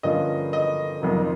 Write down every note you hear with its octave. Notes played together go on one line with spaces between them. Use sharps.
G2 D3 F3 A#3 C#4 D#5
D#5
F#1 F2 C3 D#3